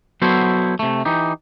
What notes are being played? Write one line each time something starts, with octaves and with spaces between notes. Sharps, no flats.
F#3 B3 E4 F#4 A4 C5
C3 A3
E3 D#4 G4